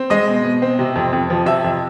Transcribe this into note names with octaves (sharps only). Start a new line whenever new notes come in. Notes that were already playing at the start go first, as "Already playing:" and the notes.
Already playing: C4
G#3 D#5 D#6
B2
B2
C4
C3
F2
F2
F3
C3 E5 E6
F2